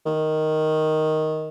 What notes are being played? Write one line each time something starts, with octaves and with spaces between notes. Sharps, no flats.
D#3